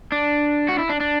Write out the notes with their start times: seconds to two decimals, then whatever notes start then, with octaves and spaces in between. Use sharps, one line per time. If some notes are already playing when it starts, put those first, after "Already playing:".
0.12 D4
0.69 F#4
0.78 E4
0.89 D4
1.00 D4